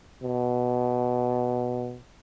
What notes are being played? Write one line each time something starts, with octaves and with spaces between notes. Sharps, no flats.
B2